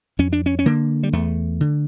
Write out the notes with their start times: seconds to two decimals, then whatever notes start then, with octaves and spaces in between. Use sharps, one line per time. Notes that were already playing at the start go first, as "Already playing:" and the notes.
0.19 F2 C#4
0.33 D4
0.46 C#4
0.59 C#4
0.66 D3 A#3
1.03 G3
1.13 E2 A3
1.61 D3